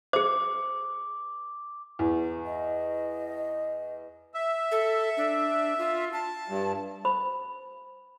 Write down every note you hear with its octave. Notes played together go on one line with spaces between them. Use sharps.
G#4 C5 D6
E2
D#5
E5
A4
D4
F4
A5
G2
C5 B5